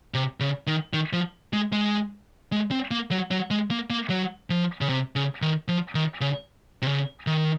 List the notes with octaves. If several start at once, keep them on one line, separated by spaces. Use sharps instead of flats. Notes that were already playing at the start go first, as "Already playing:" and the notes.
C3
C#3
D#3
D#3
F3
G#3
G#3
G#3
C4
A#3
F#3
F#3
G#3
A#3
A#3
F#3
F3
C#3
C3
C#3
D#3
F3
D#3
C#3
C3
C#3
D#3